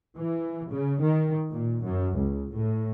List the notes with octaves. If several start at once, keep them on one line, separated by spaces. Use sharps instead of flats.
E3
C#3
D#3
A#2
F#2
C#2
A2